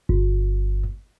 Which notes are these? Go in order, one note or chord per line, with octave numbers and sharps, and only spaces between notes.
G1